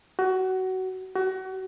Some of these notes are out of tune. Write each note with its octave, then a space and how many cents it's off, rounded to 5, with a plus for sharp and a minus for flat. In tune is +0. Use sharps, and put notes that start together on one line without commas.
F#4 +20
F#4 +30